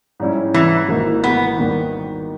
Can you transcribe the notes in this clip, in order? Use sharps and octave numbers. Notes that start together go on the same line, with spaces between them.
G#2 G3 C#4 E4
E3
G#1 G#2 E3 A#3 D#4
B3
D#2 D#3 G3 B3